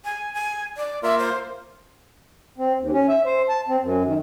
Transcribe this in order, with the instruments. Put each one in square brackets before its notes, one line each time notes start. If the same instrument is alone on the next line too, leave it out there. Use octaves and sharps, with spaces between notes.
[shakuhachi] G#5
G#5
D5
[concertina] A#3 F4 A#4 [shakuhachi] E5
[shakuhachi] C5
[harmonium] C4
D#2
C#4
E5
C5
A5
C4
F#2
D#3